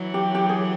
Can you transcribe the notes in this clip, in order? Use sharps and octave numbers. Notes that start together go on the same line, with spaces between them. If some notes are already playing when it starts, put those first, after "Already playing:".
Already playing: E3 F#3
G4
G4
G#4